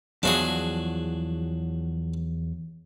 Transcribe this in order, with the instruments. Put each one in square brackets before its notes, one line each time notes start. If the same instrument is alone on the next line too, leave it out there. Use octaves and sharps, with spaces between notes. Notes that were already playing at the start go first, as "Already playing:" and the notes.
[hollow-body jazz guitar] E2 F3 F#3 [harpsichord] D4 F#4 G#4